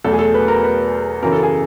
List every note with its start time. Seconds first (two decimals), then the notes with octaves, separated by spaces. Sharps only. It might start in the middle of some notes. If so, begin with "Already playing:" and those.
0.04 E2 B2 F#3 A3 A4
0.13 G#4
0.19 A4
0.34 B4
0.48 A#4
0.64 B4
1.23 F#2 C#3 E3 A#4
1.32 A4
1.43 G#4